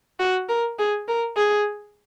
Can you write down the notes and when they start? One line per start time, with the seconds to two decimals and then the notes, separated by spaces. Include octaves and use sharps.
0.20 F#4
0.49 A#4
0.79 G#4
1.08 A#4
1.37 G#4